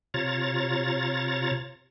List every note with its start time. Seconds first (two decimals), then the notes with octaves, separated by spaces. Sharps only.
0.14 C3 F4 C#5 A#5 A6